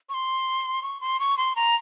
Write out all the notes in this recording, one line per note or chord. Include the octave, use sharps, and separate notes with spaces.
C#6
C6
C#6
C6
C#6
C6
A#5